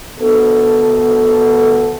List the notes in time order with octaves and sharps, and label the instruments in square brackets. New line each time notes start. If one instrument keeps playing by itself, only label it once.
[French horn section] D2 B3 A4